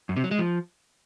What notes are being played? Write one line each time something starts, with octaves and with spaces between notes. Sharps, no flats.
F#2
C3
F#3
G#3
F3